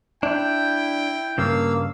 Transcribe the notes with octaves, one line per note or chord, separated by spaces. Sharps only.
D4 E4 G5
G2 C#3 A#3 F5 E6